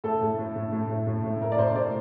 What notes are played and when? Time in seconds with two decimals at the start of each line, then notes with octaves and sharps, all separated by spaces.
0.04 A2 A4
0.21 A2
0.39 A2
0.56 A2
0.72 A2
0.90 A2
1.07 A2
1.24 A2
1.41 A2 A#4
1.52 D5
1.59 A2 C5
1.75 A2 D5